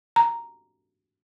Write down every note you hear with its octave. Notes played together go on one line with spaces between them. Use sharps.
A#5